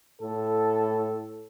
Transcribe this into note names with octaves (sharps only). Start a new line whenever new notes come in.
A2 A4